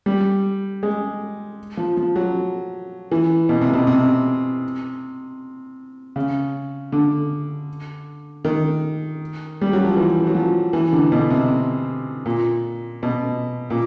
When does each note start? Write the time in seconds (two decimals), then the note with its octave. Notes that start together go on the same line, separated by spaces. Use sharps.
0.06 G3
0.83 G#3
1.77 F3
1.97 F3
2.16 F#3
3.12 E3
3.49 B2
3.61 C3
3.73 B2
3.87 C3
6.16 C#3
6.92 D3
8.45 D#3
9.61 G3
9.73 F#3
9.85 F3
9.97 E3
10.27 F#3
10.35 F3
10.73 E3
10.93 D3
11.12 B2
11.30 C3
12.26 A#2
13.03 B2
13.70 A#2